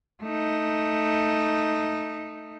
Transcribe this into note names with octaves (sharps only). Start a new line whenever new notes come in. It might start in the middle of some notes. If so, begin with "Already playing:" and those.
A3 D#4